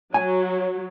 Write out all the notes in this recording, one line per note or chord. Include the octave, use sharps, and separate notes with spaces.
F#3 C#5 G#5